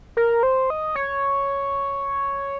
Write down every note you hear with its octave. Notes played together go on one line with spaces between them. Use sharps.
A#4
C5
D#5
C#5